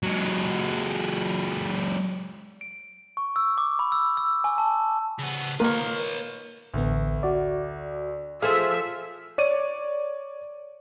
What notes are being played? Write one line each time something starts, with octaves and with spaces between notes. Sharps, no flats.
F#3 G#3
D7
C#6
E6
D6
B5
E6
E6
G#5
A5
C#3 B3
A#3 A#4 B4 C#5
A1 D2 B3 A4
F#4 D5
F3 G#4 A4 C5 E5 F5 F6
C#5 D5 D#7